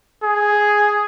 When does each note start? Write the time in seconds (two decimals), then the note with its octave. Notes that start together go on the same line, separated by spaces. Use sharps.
0.23 G#4